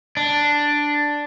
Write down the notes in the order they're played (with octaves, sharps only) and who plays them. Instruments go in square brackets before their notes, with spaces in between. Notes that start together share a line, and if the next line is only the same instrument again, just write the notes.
[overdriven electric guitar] D4